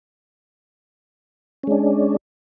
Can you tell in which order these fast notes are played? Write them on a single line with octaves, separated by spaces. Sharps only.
C#4 G#3 D4